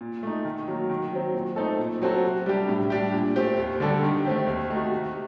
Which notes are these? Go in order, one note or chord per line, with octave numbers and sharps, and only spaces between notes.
A#2
A3 D#4
D#3
F#3 A#3
D#3
F#3 C4
A#2
A3 C4 D#4 A4
A#2
F#3 C4 F#4 A4
C3
G3 D4 G4
A2
G3 D4 G4
A#2
A3 C4 G4
D#2
D3 G3 D4 A4
D#3
A3 C4 G4
D#2
D#3 A3 D#4 F#4
C3